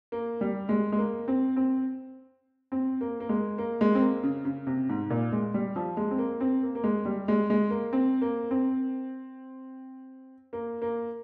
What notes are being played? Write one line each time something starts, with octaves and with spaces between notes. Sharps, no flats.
A#3
G3
G#3
G#3
A#3
C4
C4
C4
A#3
A#3
G#3
A#3
G#3
C4
A#3
C#3
C#3
C3
G#2
A#2
G#3
G3
F3
G#3
C4
A#3
C4
A#3
A#3
G#3
G3
G#3
G#3
A#3
C4
A#3
C4
A#3
A#3